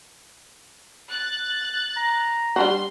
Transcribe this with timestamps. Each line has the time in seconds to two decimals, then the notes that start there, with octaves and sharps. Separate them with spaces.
1.10 F#6 A6
1.97 A#5
2.56 G3 D4 F#4 C6